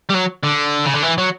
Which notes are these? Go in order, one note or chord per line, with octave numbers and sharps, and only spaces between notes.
G3
F#3
D3
C#3
D3
E3
F#3